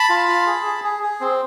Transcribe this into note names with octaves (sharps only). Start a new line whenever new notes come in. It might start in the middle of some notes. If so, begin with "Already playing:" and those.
Already playing: A5 B5
F4
F4
G#4
G#4
G#4
G#4
C4